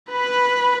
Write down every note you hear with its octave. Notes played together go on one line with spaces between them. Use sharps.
B4 B5